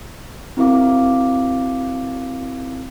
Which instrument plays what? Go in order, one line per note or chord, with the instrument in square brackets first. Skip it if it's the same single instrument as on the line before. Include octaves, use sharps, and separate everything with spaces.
[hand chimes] C4 E4 F#4 A#4 F5 D6